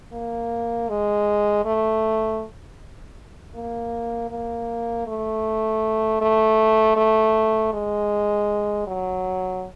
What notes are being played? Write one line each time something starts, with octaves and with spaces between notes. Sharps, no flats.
A#3
G#3
A3
A#3
A#3
A3
A3
A3
G#3
F#3